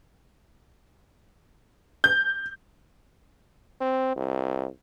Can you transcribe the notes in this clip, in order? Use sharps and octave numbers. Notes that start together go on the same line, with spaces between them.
G6
C4
C2